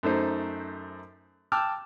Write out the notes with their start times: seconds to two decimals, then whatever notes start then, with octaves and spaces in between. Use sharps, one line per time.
0.03 F#2 A3 D#4 C5
1.52 G5 A5 D6 E6 F6